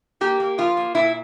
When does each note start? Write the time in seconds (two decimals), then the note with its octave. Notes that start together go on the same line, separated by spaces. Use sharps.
0.21 A#3 G4
0.40 A#3
0.58 F3 F4
0.77 A#3
0.95 A#2 E4